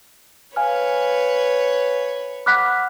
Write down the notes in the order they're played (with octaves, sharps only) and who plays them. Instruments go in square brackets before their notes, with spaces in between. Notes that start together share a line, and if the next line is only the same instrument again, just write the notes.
[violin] B4 C#5 [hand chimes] F5 G#5 F6
[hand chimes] F#5 B5 F6 [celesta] D6 F#6 B6